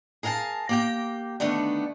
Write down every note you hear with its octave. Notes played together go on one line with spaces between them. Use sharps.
G#4 A#4 F5 G5 A5
A#3 G4 G5
D3 D#3 A3 B3 D4